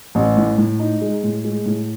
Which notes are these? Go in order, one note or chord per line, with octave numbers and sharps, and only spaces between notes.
A1
A2
A2
D#4
G#3
A2
G#3
A2